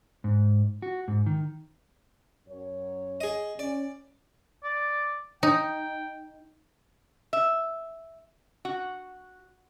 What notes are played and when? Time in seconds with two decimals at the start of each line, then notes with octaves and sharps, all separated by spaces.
0.24 G#2
0.82 F#4
1.08 G#2
1.26 D#3
2.47 F#2 C#5
3.21 G#4 D#5
3.59 C#4 D5
4.64 D5
5.43 D#4 G5
7.33 E5
8.65 F#4